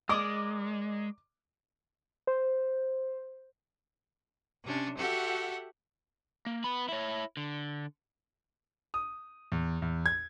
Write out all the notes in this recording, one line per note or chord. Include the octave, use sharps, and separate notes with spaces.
G#3 A#4 D5 D#5 D6
C5
C3 C#4 D4
F#4 G4 A4 E5 F#5
A#3
B3 B5
E4 C#5
D3
D#6
E2
E2
G#6